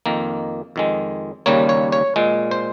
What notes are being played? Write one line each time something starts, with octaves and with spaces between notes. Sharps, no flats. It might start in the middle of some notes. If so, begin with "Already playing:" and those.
F2 D#3 A#3
F2 D#3 G#3
D#2 C#3 G3 A#3 C#5
C#5
C#5
A#2 G#3
C5